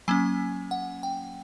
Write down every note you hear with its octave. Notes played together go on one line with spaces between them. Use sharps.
F#3 A#3 C#4 G#5
F#5
G5